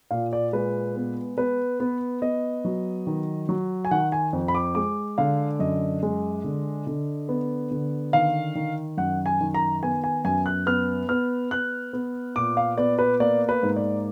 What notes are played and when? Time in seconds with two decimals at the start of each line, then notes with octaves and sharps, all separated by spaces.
0.11 A#2 F5
0.33 D5
0.53 G#3 B4
0.96 B3
1.37 B3 B4
1.80 B3
2.22 B3 D#5
2.65 F#3
3.07 D#3
3.49 F#3
3.85 G#5
3.91 D#3 F#5
4.12 G#5
4.33 F2
4.48 B5
4.55 D6
4.75 G#3 D6
5.18 D3 F5
5.59 F#2 D#5
6.03 G#3
6.44 D3
6.87 D3
7.29 B3
7.71 D3
8.13 D#3 F5
8.55 D#3
8.97 F#2 F#5
9.26 G#5
9.41 D#3
9.54 A#5
9.83 B3 G#5
10.04 G#5
10.25 F#2 G#5
10.46 F#6
10.66 B3 F6
11.09 B3 F6
11.51 B3 F#6
11.93 B3
12.36 A#2 D6
12.57 F5
12.78 B3 D5
12.99 B4
13.20 A#3 D5
13.49 B4
13.63 G#2
13.76 D5